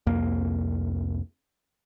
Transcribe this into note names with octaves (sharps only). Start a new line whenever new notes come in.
C2 F2 A#3